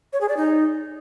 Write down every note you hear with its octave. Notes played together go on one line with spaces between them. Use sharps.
C#5
G#4
D5
D#4